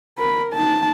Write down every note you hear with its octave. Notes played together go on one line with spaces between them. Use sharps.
A#4 B5
D#4 A5